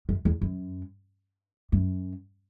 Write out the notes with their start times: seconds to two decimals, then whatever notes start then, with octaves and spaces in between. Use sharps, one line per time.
0.09 F#2
0.25 E2
0.42 F#2
1.72 F#2